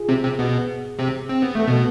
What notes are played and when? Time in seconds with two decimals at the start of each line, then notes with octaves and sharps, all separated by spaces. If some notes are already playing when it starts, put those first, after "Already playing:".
Already playing: F4 G#4
0.09 C3 C4
0.23 C3 C4
0.39 B2 B3
0.99 C3 C4
1.29 C4
1.42 B3
1.55 A3 A4
1.67 B2 B3